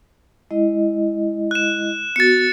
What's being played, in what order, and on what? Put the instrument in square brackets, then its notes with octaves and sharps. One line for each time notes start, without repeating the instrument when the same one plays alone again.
[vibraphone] G#3 E4 D#5
[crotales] F#6 E7
[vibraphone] B3 F#4 [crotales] A6 C#7